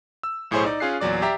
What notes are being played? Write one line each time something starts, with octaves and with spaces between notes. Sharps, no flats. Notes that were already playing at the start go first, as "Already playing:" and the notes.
E6
B1 A2 E4 G#4 C5 C#5
D#4 D5
C#4 F4 G#4 F#6 C7
E2 A#2 F#3 D5 D6
G4 D5 E5 A#5